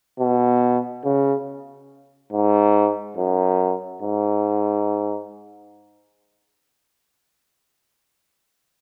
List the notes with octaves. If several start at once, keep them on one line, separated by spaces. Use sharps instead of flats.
B2
C#3
G#2
F#2
G#2